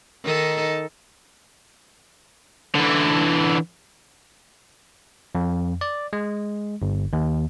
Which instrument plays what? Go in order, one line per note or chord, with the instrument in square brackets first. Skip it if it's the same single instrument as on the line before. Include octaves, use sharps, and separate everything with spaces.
[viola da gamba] D#3 D#4 A4
[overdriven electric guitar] D3 E3
[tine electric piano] F2
D5
G#3
G1
D#2